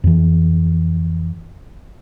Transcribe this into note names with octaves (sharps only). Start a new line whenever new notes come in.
F2 E3